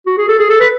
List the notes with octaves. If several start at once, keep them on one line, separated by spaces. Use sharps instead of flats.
F#4
G#4
A4
G#4
A4
B4